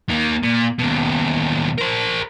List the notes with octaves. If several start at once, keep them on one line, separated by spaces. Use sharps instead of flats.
D#3 A#3
A#2
D#2 B2
A#4 C5